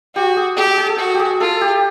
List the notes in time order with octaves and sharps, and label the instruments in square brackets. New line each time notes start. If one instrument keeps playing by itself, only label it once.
[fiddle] F#4 [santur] G4
[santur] G#4
[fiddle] G4 [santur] G#4
[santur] G#4
G#4
A4
[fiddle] F#4
[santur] G4
G#4
[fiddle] F4 [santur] A4
[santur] G4